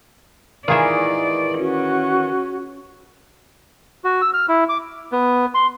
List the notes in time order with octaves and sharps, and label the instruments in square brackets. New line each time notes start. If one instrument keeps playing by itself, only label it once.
[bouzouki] D#3 E3 [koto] F4 G#4 E5 [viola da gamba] D5
[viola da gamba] C#4 [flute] F#4
[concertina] F#4
E6
F6
E4
D6
[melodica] B3
C6